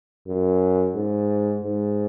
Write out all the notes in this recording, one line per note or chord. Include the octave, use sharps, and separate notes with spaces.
F#2
G#2
G#2